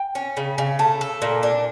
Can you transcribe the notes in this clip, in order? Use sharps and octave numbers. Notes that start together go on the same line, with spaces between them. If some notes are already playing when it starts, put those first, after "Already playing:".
Already playing: G5
C#4
C#3
C#3
A3 A5
A4
A#2
D4